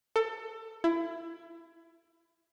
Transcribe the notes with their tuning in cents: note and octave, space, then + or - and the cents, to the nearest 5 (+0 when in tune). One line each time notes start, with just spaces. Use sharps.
A4 +25
E4 +25